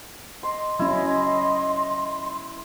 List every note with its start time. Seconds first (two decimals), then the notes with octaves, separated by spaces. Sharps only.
0.43 D#5 C6
0.79 F#3 C#4 E4 C6